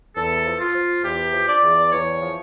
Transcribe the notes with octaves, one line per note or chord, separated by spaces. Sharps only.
E2 A4
F3
F4
F3
E2 G4
F3
D5
E2
E2 C#5
F3